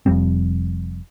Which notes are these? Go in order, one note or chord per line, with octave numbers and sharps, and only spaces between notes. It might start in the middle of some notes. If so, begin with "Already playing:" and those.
F1 F2 G3 C4